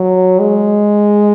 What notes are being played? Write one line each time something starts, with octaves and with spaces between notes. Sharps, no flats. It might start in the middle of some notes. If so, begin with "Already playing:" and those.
Already playing: F#3
G#3